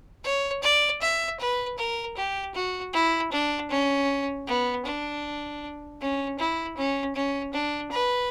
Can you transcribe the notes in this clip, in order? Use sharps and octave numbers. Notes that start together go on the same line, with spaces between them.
C#5
D5
E5
B4
A#4
G4
F#4
E4
D4
C#4
B3
D4
C#4
E4
C#4
C#4
D4
B4